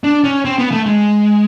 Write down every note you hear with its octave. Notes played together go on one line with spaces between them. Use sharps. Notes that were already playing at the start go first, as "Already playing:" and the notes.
D4
C#4
C4
B3
A3
G#3